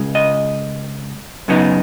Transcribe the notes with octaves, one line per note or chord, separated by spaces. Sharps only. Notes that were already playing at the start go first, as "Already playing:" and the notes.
Already playing: C#2 C#3 G#3
D#5
F#2 C#3 F#3 B3 D#4